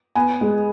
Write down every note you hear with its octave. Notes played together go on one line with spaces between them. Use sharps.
B3 G#5
G#3